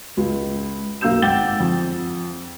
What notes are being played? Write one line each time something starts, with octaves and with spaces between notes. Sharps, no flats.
C#2
B1 A#3 F5 E6 G6 E7
G#1 F#5 G5 D6 A6 G7
F2